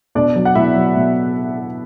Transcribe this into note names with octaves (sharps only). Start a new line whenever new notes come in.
B2 D4 D5
F#3
F#5
B2 E4 E5
F#3
B2